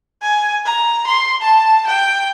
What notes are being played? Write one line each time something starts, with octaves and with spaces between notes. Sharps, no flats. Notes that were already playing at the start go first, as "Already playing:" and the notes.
G#5
A#5
C6
A5
G5